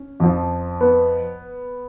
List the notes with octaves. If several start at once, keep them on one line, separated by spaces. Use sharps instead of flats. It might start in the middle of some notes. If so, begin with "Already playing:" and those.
Already playing: C#4
F2 F3
B3